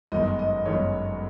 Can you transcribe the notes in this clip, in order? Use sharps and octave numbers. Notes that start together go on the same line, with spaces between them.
G1 F#2 D#3 G#3 D#5
D#5
G1 F#2 D#3 G#3 C#5